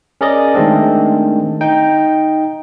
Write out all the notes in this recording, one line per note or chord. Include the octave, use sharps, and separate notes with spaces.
C#4 G#4 A#4 D5 D#5
D#3 G#3 A3 C4 D4
D#4 G5